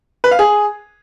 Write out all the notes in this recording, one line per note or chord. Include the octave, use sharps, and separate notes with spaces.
B4
F5
G#4